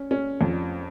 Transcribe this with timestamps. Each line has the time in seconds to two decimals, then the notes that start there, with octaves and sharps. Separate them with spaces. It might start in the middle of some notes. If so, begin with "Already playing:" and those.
Already playing: C#4
0.11 C#4
0.41 F2